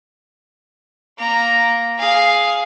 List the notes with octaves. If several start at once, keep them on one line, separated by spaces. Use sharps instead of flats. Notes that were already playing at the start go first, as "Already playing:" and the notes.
A#3 A#5
G#4 F5